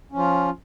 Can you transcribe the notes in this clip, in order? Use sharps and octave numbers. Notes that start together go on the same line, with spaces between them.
F3 C#4 F4